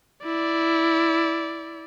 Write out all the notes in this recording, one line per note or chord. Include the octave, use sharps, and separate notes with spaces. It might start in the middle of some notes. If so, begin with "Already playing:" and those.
E4 D5